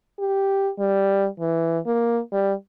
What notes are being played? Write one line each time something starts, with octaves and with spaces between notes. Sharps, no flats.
G4
G3
E3
A#3
G3